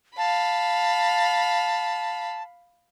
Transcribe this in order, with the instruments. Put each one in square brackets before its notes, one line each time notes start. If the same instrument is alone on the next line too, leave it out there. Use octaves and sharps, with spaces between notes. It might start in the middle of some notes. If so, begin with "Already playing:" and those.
[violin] F5 B5 [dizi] A5